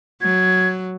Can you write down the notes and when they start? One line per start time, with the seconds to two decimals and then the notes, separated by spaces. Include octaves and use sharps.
0.21 F#3 G#6